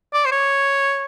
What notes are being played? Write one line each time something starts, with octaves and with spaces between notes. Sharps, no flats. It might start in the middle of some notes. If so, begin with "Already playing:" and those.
D5
C5
C#5